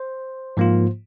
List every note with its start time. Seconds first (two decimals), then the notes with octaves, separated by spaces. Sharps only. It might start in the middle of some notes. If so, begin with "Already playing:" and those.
Already playing: C5
0.57 G#2 F3 A#3 F4